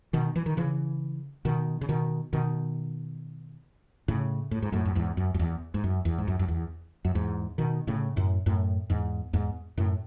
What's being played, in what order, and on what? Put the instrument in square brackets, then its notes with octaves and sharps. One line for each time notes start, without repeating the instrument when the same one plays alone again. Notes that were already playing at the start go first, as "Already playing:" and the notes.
[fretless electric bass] B2 D#3
E3
D#3
C#3 E3
B2 D#3
C#3
B2 D#3
B2 D#3
A2 C#3
A2
G#2
F#2 A2
F#2
E2 G#2
F#2
F#2
E2
G#2
F#2
E2
G#2
F#2
F#2
E2
F#2
E2 G#2
B2 D#3
A2 C#3
F#2 A2
F#2 A2
E2 G#2
E2 G#2
F#2 A2